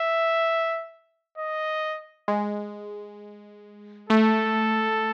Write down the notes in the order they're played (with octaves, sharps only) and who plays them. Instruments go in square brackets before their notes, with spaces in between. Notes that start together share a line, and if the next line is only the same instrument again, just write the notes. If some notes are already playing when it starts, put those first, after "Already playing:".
Already playing: [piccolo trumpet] E5
D#5
[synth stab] G#3
[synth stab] A3 [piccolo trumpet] A4